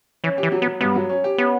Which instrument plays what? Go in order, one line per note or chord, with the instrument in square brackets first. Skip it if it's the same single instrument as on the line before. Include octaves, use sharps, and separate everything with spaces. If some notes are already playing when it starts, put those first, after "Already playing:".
[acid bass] E3 [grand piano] C#4
[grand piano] G4
[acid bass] E3
[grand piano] F#3
[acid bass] B3
[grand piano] F#3
[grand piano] G2 [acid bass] B3
[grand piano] F#3
C#4
G4
[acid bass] B3 [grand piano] C#4